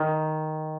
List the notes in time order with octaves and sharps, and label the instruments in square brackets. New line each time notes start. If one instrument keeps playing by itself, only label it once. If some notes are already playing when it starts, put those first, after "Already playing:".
Already playing: [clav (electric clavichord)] D#3